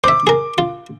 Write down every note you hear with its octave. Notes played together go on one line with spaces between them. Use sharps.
C5 E5 D6
G#4 A#4
F4